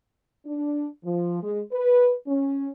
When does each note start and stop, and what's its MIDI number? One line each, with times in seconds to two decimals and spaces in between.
0.46 0.87 62
1.05 1.42 53
1.43 1.61 56
1.72 2.14 71
2.27 2.70 61